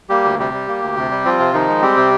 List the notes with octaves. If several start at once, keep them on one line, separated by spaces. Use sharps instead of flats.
G3 A#3 G4
D2
C3 G3 G4
G3
A#3
D2
C3
G3
F3 C4 F4
C3
D#3 F3 D#4
G#3
G3 C4 G4
C3